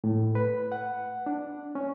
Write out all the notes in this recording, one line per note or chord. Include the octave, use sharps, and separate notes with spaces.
A2
B4
F#5
D4
C#4